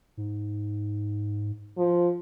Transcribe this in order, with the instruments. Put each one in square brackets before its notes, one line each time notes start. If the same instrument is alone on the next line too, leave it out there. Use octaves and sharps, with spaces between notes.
[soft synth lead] G#2
[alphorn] F3